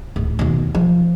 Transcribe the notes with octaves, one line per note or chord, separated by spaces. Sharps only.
D1
D#2 B2
F3